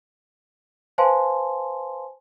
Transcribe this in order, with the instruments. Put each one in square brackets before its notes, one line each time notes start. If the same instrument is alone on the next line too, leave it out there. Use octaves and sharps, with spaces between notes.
[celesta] B4 C5 F5 G#5 A5 C6